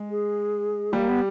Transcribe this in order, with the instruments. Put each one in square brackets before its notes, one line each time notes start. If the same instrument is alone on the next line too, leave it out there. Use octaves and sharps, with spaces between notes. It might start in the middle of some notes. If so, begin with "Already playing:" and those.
Already playing: [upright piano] G#3
[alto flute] G#4
[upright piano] G3 [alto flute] A#3
[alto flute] B3